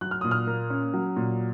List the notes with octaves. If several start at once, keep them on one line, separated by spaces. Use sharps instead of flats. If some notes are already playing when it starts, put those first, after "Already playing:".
F#3 F#6
F6
A#2 D#6
F6
A#3
C#4
F#3
A#2